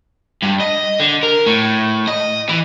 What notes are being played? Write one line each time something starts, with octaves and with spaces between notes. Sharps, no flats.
G2
D#5
D3
A#4
A2
D#5
E3